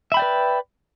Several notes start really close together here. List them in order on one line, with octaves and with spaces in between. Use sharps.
E5 B5 G5 D5 B4